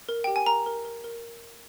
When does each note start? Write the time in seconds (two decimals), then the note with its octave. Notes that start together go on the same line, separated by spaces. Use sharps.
0.09 A#4
0.24 G4 G5
0.36 G#5
0.46 A#4 A#5
0.66 A#4
0.85 A#4
1.04 A#4